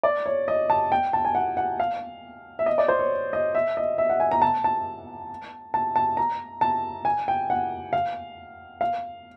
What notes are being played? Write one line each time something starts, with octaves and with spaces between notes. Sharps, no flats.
D5
C#5
D#5
A5
G5
A5
G#5
F#5
F#5
F5
E5
D#5
D5
C5
C#5
D#5
E5
D#5
E5
F#5
G#5
A#5
A5
A5
A5
A5
A#5
A5
G#5
G5
F#5
F5
F5